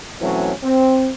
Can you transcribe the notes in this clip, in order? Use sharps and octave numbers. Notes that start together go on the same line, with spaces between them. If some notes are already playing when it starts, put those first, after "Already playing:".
B2 E3 F#3 A3 C4 C#4
C4